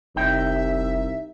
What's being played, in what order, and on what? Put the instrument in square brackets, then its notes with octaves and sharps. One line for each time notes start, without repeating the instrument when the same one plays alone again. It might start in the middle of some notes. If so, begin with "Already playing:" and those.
[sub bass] F1 [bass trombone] C2 [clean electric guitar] D#4 G5 [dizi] E5